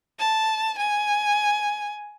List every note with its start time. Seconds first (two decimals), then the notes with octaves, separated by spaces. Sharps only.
0.19 A5
0.79 G#5